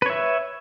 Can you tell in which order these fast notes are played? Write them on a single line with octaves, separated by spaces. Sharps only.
B4 C#5 E5